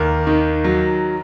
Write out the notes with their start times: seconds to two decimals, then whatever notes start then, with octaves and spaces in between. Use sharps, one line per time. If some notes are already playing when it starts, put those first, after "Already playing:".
Already playing: D#2 A#4
0.27 D#3
0.64 F#3